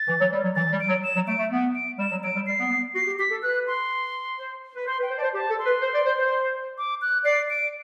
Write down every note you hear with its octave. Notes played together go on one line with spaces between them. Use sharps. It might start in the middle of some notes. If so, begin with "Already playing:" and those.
Already playing: A6
E3
F#3
G3
F#3
E3 A6
G3
D7
F#3
E7
F#3
A3 D7
A3
B3
D7
G3 E7
F#3
F#3 D7
G3
G3 C7
B3
B3
F#4 C7
G4
G4 B6
A4
B4 F#6
C6
C5
B4
C5 C6
B4
G5
C5
C5 D5 A5
G4 A5
A4
C6
B4
C5
D5
C5
C5
D6
F#6
D5 C7
D7